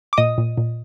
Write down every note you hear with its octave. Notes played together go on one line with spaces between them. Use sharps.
D6
A#2 D#5 D#6
A#2
A#2